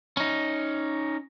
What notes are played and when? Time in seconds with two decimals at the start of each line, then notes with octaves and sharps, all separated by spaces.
0.17 C#4 D#4